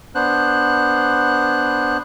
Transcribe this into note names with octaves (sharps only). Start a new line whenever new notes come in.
B3 D4 C5 F#6